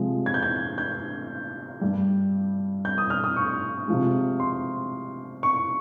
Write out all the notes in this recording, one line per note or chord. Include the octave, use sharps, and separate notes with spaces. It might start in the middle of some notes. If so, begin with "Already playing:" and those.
Already playing: C3 F3 G#3
G#6
G6
G#6
G6
G2 G3
G6
D#6
F6
D#6
C#6
C3 F3 G#3
C6
C#6